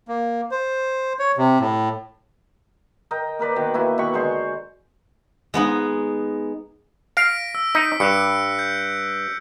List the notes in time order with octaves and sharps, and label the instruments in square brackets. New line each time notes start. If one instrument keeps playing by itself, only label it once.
[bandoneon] A#3
C5
C#5
C3
A2
[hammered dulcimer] A#4 D#5 G5
A#3 A#4 B4 D5
B2 D#3
A#3 E4 F#4 G#5
B2 D#3 B5 C#6
D3 G#3 C5 C#6
[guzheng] G#3 B3 D#4
[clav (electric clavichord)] F5 [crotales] A#6 B6 D7
[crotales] E6
[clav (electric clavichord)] D#4 [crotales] B6
[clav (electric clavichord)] G2 [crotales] F#6 C#7
[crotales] G6